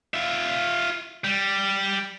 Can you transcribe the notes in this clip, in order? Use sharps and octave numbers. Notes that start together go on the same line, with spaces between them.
F4 E5
G3